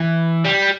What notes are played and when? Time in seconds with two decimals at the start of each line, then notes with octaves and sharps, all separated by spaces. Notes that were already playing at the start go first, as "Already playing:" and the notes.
Already playing: E3
0.45 G3